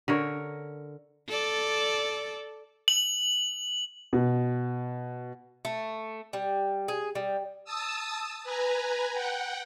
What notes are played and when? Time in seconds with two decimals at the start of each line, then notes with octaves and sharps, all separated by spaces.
0.08 D3 A#4 C#5
1.29 A4 D5
2.88 F#7
4.13 B2
5.65 A3
6.33 G3
6.88 G#4
7.15 G3
7.65 A5 D#6 E6
8.44 B4 G#5 A#5
9.13 F#5 G5